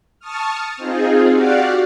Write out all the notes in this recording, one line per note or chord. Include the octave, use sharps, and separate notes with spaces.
A5 C#6 D#6 F6
C4 D#4 F4 G#4
F#4 G4 D5 F5 F#5